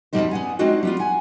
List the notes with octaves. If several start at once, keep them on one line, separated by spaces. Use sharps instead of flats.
F2 G#2 B2 G3 D#4 C5
B3 F#5 G#5
G#3 C4 D4 D#4 F4 F#4
G3 B3 F4
F#5 G#5